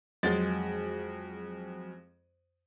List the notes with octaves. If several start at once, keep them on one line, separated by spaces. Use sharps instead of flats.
F2 F#3 G#3 F#4 G#4 A6